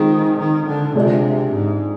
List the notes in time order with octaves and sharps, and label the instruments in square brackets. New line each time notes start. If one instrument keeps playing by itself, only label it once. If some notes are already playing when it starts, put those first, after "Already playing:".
Already playing: [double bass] D#3 [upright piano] G#3 C4 F4 G#4
[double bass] D#3
D3
[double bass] C3 [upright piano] G#3 D4 F4
[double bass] G#2